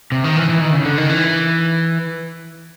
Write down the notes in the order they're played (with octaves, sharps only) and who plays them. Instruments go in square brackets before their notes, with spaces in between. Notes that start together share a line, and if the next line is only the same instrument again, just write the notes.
[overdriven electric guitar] C3
D#3
E3
E3
D#3
C#3
D3
D#3
E3